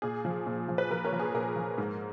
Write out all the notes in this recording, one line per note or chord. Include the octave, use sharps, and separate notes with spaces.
A#2 G#4
F3
A#2
F3
B4
F3 A#4
A#4 C#5
F3
G#4
A#2 A#4
F3
G#2